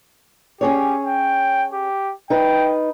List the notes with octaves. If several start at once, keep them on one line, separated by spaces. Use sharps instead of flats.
C#4 G4 G#4 C#5
G5
G4
D#4 B4 G5